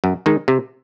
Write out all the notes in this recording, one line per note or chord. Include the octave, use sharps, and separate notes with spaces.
F#2
D#3 G#3 D#4
C3